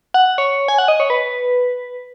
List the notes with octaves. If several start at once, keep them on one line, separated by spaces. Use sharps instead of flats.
F#5
C#5
G#5
F#5
D#5
C#5
B4